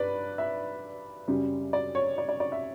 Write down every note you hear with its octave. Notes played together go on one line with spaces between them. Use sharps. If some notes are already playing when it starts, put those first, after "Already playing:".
Already playing: G2 B4 D5
E5
F#2 C#3 G3
D5
C#5
D5
D5
D5
E5